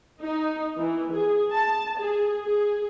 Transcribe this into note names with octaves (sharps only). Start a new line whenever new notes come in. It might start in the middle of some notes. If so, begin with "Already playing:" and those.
D#4
E3
G#4
A5
G#4
G#4